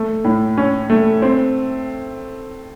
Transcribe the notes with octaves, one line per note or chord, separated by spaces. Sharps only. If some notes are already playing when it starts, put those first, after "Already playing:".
Already playing: A3
A2
C#4
A3
C4